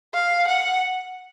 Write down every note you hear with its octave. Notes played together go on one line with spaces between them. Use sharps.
F5
F#5